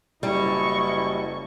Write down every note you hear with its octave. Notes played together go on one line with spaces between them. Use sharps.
F#1 G3 E4 D#5 C#6